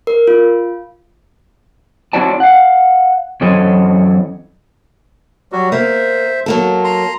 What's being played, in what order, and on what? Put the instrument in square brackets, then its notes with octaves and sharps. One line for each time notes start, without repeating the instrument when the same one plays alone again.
[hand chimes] A#4
F4
[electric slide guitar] C4 E4 F#4 C#5 D5 A5
F5 F#5
F#2 E3 C4 A4 C#5 D#5
[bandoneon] F#3 G3 F#4
[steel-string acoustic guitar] A#3 [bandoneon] C5 E5
[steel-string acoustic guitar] F#3 A#3 A4
[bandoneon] A#5 C6